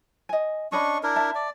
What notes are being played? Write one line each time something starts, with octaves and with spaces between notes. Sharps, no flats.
D#5 G#5
C#4 D4 D#5 B5 C#6
D4 E4 A#4
E5 A5
D5